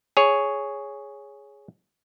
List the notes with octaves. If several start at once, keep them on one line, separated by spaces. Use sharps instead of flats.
G#4 C#5